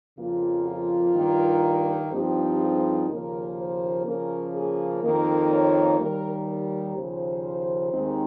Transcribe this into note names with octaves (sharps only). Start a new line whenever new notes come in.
F2 C#3 F3 A#3 F4
F4
G2 D#3 A#3
G2 F3 C4 D#4 G4
G#4
D#2 C#3 F3 A#3 A#4
C5
C#3 F3 A#3 C#4 A#4
G#4
F2 D#3 A#3 D#4 A#4
C#5
D#2 D#3 G3 A#4
A#4
D#2 C#3 F3 C5
D#2 D#3 G#3 C4 D#4